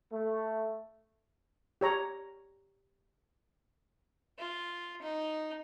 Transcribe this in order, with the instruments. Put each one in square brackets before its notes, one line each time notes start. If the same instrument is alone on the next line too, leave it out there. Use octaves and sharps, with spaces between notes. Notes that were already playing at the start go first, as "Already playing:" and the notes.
[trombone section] A3
[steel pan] G4 C#5 A#5
[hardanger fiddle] F4
D#4